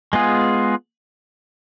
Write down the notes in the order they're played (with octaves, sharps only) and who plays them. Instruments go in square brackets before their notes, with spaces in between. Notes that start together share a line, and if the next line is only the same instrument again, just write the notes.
[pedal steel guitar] G#3 B3 F4 G#4